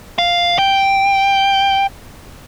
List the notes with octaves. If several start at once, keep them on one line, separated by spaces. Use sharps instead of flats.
F5
G5